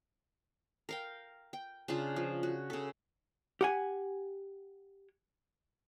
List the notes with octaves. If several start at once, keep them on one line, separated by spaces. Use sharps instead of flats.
A#4 F5 G5
G5
C#3 D4 F4 A5
F3
F#4
C#3 A4
G4 F#5 G#5